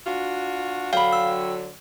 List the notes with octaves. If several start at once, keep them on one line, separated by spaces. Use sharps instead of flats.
D4 F4 F#4
D3 F#3 F5 G5 B5
E6